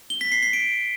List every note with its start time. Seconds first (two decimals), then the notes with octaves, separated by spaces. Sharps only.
0.10 G7
0.21 B6
0.32 C7
0.42 C7
0.53 D7